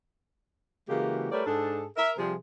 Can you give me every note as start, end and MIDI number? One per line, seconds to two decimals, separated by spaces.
0.89 1.30 49
0.89 1.30 52
0.89 1.30 56
0.89 1.30 58
0.89 1.30 66
0.89 1.30 67
1.31 1.44 55
1.31 1.44 57
1.31 1.44 70
1.31 1.44 71
1.31 1.44 73
1.31 1.44 74
1.46 1.85 44
1.46 1.85 62
1.46 1.85 68
1.46 1.85 69
1.96 2.11 70
1.96 2.11 76
2.18 2.34 48
2.18 2.34 53
2.18 2.34 55
2.18 2.34 60
2.18 2.34 68